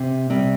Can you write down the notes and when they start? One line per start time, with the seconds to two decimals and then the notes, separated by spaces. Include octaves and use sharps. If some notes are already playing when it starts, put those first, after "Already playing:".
Already playing: C3
0.30 C3 G3